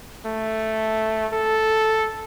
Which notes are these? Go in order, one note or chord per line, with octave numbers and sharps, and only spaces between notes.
A3
A4